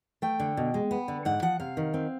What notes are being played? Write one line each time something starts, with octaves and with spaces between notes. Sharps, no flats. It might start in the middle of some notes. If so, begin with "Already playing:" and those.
A3 G5
D3
B2
G#3
B3
D3
G#2 F#5
F3 F#5
C3 F5
D#3
C4